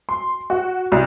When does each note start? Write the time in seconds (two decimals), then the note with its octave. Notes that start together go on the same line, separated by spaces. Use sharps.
0.09 C6
0.50 F#4
0.92 C2